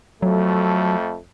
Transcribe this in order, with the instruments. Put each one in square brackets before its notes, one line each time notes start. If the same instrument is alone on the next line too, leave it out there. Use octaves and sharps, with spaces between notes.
[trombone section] F2 A3 [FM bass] F#3